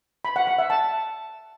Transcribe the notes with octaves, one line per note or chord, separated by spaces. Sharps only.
B5
F#5
F#5
E5
A5